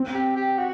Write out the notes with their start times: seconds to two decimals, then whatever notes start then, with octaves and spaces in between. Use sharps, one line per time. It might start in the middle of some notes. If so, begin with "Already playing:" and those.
Already playing: C4
0.14 G4
0.36 G4
0.58 F#4